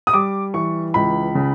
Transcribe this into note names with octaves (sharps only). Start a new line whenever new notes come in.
D#6
G3 D6
E3 C#6
C#2 B5
C#3